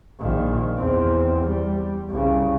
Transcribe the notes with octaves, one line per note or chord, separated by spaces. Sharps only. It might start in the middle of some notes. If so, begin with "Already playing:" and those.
A#1 D#3
E2 C4
G3
C2 C#3